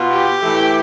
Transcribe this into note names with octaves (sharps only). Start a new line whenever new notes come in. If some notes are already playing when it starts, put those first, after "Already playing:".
Already playing: B2 B3 F4
G4
A2 E3 A3 E4